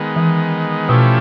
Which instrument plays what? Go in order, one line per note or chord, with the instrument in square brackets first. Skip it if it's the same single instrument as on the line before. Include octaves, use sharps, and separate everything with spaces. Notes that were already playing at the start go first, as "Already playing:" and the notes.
Already playing: [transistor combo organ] D#3 G#3 B3
[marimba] E3
[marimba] B2 [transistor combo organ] F3 A3 C#4 E4 G4